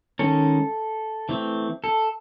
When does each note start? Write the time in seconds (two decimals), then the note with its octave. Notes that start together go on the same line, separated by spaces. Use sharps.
0.19 D#3 G#3 C#4 A4
1.29 E3 A3 C4
1.84 A4